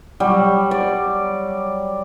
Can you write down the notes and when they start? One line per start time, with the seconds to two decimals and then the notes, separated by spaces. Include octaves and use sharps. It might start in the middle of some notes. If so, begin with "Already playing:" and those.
0.20 F#3 G3
0.71 D5